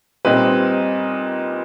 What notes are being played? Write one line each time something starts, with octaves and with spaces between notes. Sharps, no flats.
A#2 G3 C4 D#4 B4